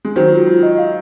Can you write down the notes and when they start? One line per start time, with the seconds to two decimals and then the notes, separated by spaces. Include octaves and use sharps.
0.05 G#3
0.16 D#3 F#3 C5
0.32 F4
0.48 F4
0.63 D#5
0.78 F5